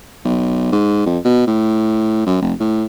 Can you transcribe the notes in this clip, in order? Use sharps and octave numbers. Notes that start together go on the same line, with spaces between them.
B1
G#2
F2
B2
A2
F#2
F1
A2